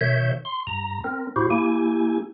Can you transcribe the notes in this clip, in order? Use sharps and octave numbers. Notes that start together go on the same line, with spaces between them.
B2 D#3 C#5 E5 G6
C6
G2 A#5
C4 A#4
A2 E4 F#4 G4 C5
A#3 E4 G4 G#5